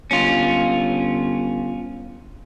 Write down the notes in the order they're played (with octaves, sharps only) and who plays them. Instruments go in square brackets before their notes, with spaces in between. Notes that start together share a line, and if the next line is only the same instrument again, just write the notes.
[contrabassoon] G1 [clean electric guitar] C#4 F4